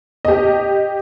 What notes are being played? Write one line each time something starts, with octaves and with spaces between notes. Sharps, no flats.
G4 D#5